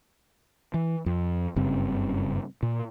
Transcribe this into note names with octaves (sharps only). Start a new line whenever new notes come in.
E3
F2
F#1 G2 C#3 C4
A#2